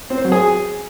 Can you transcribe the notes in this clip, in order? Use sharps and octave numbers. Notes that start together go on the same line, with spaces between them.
C4
C5
F#3
G#4